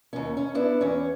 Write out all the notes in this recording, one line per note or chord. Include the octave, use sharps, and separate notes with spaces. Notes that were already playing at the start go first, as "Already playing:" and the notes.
D#2 C#4
C#4
B3 D4 E4
E2 C#4